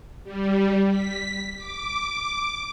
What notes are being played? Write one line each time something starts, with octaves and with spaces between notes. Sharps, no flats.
G3
B6
D6